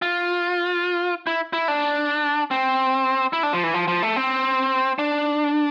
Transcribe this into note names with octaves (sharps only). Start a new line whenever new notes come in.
F4
E4
E4
D4
C4
E4
D4
F3
E3
F3
F3
A3
C4
D4